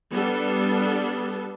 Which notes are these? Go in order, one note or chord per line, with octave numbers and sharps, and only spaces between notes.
G3 B3 D4 A4